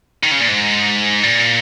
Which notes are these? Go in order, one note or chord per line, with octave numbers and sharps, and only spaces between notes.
D#3
C#3
A#2
G#2
A#2